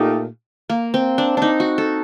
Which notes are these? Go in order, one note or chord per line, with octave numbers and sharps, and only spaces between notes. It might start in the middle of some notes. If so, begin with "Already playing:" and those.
Already playing: A#2 A3 D#4 G4
A#3
C4
D4
D4 D#4
F#4
A4